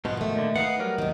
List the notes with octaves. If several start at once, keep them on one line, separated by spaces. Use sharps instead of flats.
G#2 B2 F3 B3
D#3 A3
A#2 D3
B3 D#4 F5 F#5
F#3 G3 A#4
D#2 D#3